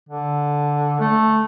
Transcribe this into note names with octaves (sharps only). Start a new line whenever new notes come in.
D3
A3